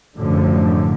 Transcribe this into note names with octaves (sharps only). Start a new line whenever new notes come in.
F#2 A2 D3 F3